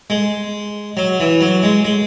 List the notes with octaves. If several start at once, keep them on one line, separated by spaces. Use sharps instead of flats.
G#3
F#3
E3
F#3
G#3
G#3